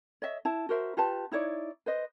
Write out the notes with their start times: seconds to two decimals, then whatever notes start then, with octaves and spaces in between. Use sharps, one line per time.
0.22 C#5 D#5 E5
0.45 E4 A5
0.69 F#4 A#4 C5 E5
0.97 F4 G4 B4 A5
1.32 D#4 E4 C#5 D5
1.86 B4 C5 D#5